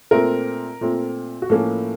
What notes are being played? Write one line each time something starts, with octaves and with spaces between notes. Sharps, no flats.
A#2 A3 C4 A#4
A#2 A3 C4
F#4
A2 F3 A#3 C#4 A4